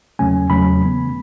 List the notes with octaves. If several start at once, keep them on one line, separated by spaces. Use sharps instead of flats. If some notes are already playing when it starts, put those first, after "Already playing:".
E2 C#3 F#3 A3 C#4 G#5
E2 C#3 F#3 A3 C#4 B5
C#3 E3 B3